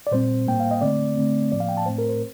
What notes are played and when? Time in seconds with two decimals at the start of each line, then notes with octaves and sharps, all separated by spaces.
0.07 D5
0.12 A#2 G3 C4 C5
0.47 A2 G3 A#3 G5
0.60 F5
0.71 D#5
0.82 D3 A3 C4 D5
1.17 D3 A3 C4
1.52 A2 F3 A#3 D5
1.60 F5
1.69 G5
1.77 A5
1.86 A2 A3 C4 C5
1.98 A#4
2.09 C5